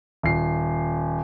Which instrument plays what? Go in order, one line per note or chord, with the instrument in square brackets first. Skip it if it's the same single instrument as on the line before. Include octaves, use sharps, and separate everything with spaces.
[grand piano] D#1 C7